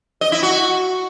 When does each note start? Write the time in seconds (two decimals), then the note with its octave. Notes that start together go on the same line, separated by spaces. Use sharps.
0.21 D#5
0.32 E4
0.43 F#4